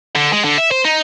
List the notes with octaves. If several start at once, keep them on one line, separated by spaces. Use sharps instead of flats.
D3
G#3
D3
E5
C5
D#4